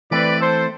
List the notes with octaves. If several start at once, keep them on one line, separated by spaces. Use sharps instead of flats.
E3 A3 C4 B4 D5
A4 C5